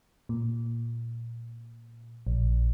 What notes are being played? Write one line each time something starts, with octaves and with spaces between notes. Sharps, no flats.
A#2
A#1